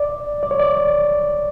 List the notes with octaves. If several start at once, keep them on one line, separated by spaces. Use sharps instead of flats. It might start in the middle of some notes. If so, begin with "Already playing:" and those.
Already playing: D5
D5
C#5
D5